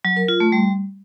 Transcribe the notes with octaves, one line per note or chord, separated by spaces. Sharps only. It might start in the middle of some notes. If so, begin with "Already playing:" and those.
F#3
A#4
F4
A3
G3